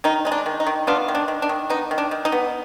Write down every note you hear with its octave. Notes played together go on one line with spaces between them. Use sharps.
D#3 D#4
G#3 D#4
D4
D#3
D#4
D#3
B3 D4 F4
D#3
D4
D#3
D4
D#3
B3 D#4
D#3
D4
D#3
D#4
B3